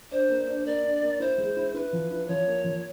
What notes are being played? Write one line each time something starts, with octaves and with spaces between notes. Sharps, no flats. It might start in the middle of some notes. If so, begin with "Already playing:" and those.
D4 C5
A#3
D4
A#3 D5
D4
A#3
E4 C5
G#3
E4
E4 B4
F3
E4
F3 C#5
A#3
F3